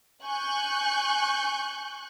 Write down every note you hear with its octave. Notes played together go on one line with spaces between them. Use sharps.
G#5 C#6 F#6 G6